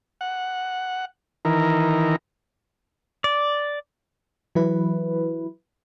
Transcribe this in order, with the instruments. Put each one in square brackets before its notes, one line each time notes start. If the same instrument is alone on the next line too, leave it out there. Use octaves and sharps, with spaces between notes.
[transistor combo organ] F#5
D#3 E3 A#4
[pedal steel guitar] D5
[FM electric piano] E3 F#3 E4 B4